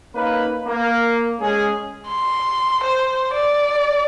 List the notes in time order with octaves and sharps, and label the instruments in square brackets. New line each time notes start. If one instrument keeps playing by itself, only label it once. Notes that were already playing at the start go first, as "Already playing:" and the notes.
[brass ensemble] A#3 C#4 D#4 B4
A#3
G#3 C#4 G#4
[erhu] C6
C5
D5